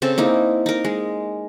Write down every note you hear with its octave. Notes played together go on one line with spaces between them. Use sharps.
C#3 C4 A4
A#3 D#4 E4
D#4 A#4
G#3